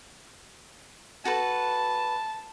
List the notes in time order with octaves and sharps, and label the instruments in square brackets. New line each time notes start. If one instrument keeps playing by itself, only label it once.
[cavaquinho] F#4 A4 B4 [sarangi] A5